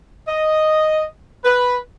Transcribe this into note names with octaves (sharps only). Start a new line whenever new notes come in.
D#5
B4